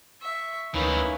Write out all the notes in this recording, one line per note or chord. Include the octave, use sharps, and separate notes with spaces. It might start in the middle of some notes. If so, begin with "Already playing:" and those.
E5 C#6
D2 D#3 E3 A#3 C#4 E4 B4